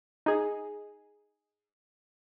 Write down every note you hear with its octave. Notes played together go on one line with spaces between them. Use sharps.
D#4 G#4